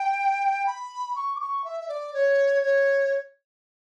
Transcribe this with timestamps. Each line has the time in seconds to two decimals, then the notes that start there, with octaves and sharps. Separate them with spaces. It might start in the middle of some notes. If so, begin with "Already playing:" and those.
Already playing: G5
0.66 B5
1.15 C#6
1.36 D6
1.40 C#6
1.64 E5
1.80 E5
1.88 D5
2.14 C#5
2.62 C#5